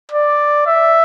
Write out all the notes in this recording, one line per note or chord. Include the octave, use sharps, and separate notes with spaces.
D5
E5